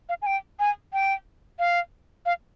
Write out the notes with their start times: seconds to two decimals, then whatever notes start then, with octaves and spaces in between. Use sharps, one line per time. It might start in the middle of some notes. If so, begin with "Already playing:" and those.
0.09 F5
0.22 G#5
0.26 G5
0.60 G#5
0.93 G5
1.59 F5
2.26 F5